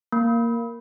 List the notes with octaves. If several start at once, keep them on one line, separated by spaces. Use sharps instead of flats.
A#3